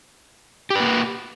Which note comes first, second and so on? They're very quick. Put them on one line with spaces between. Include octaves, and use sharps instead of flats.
G4 B4 A#3